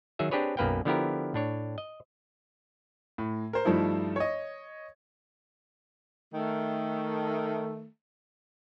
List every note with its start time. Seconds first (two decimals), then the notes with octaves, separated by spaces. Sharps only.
0.19 D#3 F#3 G#4 E5
0.31 C4 D4 G4 G#4 B4 C#5
0.57 B1 F#2 A#3 B4 F5 G5
0.85 D3 F3 B3 E4 G4 A#4
1.34 A2 D4 C#5
1.78 D#5
3.18 A2
3.53 A#4 C5
3.65 G2 F3 A3 D#4 E4
4.16 C#5 D#5
6.33 D#3 A3